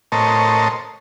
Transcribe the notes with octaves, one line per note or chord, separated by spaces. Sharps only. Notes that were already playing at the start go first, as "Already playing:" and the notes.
A2 A#4 C5 C#5 D#5 A5